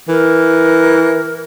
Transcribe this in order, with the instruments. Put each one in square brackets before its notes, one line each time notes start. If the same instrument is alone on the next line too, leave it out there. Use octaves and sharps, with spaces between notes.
[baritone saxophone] E3 [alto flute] A#4